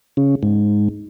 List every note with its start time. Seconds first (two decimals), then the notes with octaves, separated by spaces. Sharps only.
0.17 C#3
0.43 G#2